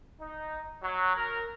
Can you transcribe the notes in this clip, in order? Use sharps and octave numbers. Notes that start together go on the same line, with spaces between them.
D#4
F#3
A#4